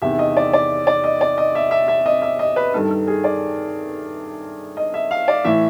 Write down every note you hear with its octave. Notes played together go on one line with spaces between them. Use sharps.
E2 C3 D#3 E5
D#5
D5
D5
D5
D#5
D5
D#5
E5
E5
E5
D#5
E5
D#5
B4
G2 D#3 A4
A4
G#4
D5
D#5
E5
F5
D5
A2 E3 E5